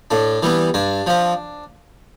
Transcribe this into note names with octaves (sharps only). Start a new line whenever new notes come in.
A2 D4
E3 G3 B3
G2 D4
F3 C4